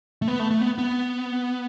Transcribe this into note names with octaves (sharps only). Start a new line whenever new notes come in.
A3
B3
A3
A3
B3
B3